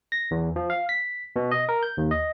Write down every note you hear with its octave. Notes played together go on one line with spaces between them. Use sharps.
A#6
E2
F3
F5
B6
B2
D#5
A#4
G6
D#2
D#5